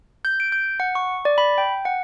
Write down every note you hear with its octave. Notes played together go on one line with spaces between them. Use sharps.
G6
D7
G6
F#5
C#6
D5
B5
G5
F#5